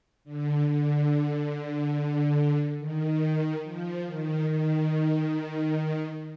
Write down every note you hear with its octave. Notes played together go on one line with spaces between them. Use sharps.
D3
D3
D#3
F3
D#3
D#3